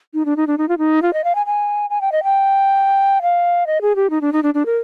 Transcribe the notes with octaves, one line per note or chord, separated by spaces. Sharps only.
D#4
D4
D#4
D4
D#4
F4
D#4
F4
D#5
F5
G#5
G#5
G#5
G5
D#5
G5
F5
D#5
G#4
G4
D#4
D4
D#4
D4
D4
A#4